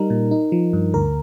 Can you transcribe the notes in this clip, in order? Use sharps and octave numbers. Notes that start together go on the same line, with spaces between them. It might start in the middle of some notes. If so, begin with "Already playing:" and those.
Already playing: G3 D#4 A#4
A#2
D#4
F3
G2
D2 A#4